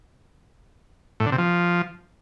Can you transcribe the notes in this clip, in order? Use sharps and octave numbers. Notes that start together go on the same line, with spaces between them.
A2
D3
C3
F3